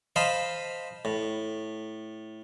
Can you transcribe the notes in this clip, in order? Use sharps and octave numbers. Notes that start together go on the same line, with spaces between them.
C5 D#5 F5 A5 B5 C6
A2